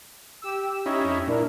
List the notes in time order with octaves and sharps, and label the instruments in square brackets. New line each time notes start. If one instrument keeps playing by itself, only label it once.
[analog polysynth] G4 E6
[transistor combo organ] C#4 D#4 E4
[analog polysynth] F2
[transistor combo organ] A#2 [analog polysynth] D4 E4 A#4